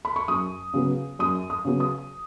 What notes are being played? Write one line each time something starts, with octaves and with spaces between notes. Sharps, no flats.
B5
C#6
F#2 D#6
C#3 F#3 B3
F#2 D#6
D#6
C#3 F#3 B3
D#6